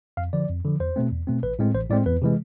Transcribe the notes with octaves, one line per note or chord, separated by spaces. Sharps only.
F2 F5
D3 F3 D5
F2
D3 F3
E2 C5
B2 A3 C4
E2
B2 A3 C4
A1 B4
A2 G#3 C4
A1 C5
A2 G#3 C4 D5
E2 B4
C3 E3 G#3